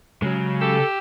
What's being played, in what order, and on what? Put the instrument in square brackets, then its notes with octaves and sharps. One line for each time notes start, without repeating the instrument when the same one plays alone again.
[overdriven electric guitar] C#3 [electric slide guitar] F#3 G#3
[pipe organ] G4 E6 [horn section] A4